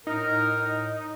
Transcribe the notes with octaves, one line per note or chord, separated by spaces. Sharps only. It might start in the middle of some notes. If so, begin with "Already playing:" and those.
A2 D#4 A#4